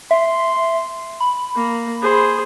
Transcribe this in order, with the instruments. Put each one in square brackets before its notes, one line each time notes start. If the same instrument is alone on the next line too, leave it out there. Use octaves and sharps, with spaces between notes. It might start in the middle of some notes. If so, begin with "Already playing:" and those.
[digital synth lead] E5 [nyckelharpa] C6
[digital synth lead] B5
[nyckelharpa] A#3
G#4 C5